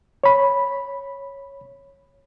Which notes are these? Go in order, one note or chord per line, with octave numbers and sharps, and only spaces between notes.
C#5 B5